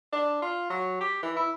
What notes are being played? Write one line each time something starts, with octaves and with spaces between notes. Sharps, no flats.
D4
F4
F#3
G4
E3
E4